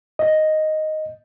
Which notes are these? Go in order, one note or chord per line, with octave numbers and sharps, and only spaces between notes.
D#5